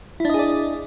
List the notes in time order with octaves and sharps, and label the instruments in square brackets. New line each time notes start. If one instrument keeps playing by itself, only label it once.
[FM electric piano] E4
D4
D#5
G#4
D5